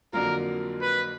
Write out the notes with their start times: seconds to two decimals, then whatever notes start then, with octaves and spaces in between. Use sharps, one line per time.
0.13 F2 D3 F#3 A#3 F4 A#4
0.82 B4